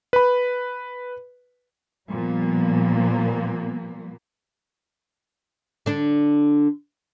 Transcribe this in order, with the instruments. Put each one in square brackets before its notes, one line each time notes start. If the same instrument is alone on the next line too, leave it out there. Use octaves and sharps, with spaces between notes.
[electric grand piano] B4 B5
[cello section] A#2 F3 G3 A#3 B3
[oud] D3 D4